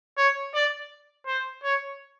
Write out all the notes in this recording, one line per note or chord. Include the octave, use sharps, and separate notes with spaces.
C#5
D5
C5
C#5